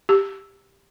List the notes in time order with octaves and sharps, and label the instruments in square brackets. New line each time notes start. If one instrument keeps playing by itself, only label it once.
[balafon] G4